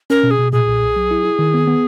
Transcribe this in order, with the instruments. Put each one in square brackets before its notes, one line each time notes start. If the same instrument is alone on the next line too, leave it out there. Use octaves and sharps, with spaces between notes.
[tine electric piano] C#4 [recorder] A#4
[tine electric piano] B2
[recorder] G#4
[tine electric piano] B2
[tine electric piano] A#2 [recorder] G#4
[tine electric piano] B1
B1
F#3
E4
E4
D#3
B3
B3